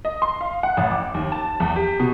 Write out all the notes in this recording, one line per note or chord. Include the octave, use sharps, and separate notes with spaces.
D#5
C6
F5
F#5
A1
D6
D#2
A5
E2
G4
B2